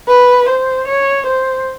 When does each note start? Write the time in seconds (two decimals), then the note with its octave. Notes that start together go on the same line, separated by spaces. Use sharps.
0.08 B4
0.48 C5
0.88 C#5
1.27 C5